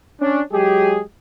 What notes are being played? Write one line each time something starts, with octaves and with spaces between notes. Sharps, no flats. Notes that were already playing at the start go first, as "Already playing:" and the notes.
C#4 D4
F#3 G#3 G4 G#4